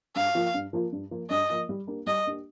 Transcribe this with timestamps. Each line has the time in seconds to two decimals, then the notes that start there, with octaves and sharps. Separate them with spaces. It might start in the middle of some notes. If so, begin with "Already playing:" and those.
0.16 G2 F5
0.35 F3 A#3 F4
0.54 G2
0.73 F3 A#3 F4
0.92 G2
1.11 F3 A#3 F4
1.30 G2 D#5
1.50 F3 A#3 F4
1.69 G3
1.87 A#3 D4 G4
2.06 G3 D#5
2.25 A#3 D4 G4